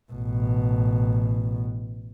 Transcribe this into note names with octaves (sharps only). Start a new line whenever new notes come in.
A1 B2